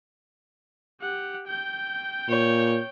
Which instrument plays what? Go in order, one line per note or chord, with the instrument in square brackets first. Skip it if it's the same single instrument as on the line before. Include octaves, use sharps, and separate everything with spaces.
[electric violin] G4 F#5
G5 G6
[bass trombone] A#2 [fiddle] C#5